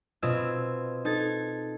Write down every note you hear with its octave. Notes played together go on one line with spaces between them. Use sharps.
B2 C4 F4 D#5 E6 G#6
D#4 A4 G#6 A6